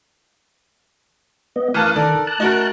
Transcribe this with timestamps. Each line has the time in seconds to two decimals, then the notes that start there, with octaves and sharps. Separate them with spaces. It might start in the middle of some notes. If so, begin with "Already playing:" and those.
1.56 B3 D#5
1.74 E3 A3 A#4 F5 A5 D#6 F#6
1.96 D#3 A4 A#4 D5
2.27 A5 F#6
2.40 A3 D#4 F#4 A#4